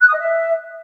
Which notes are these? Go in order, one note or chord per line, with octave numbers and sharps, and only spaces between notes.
F#6
D#6
D#5
E5